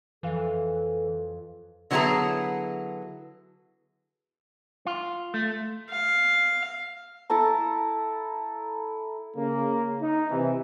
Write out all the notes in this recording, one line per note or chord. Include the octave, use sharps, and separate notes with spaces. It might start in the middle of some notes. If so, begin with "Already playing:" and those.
F2 E3 A4 F5 E7
D3 F#3 B3 E4 G#4 A#5
F4
A3
F5
E4 A4 A5 A#5
C#3 A#3
D#4
C3 E3